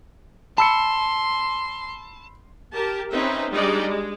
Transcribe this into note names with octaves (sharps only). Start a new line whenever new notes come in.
A5 B5 C6 E6 C#7
G4 A#4 A5
C4 C#4 D#4 B4 C5 E5
G3 G#3 D4 D#4 D5 D#5
G#3